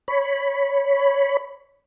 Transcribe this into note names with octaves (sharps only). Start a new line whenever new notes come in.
C#5 B5